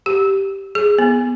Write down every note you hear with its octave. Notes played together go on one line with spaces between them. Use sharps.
G4
G#4
B3